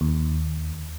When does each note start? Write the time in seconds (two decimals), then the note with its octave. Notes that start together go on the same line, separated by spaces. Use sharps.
0.01 D#2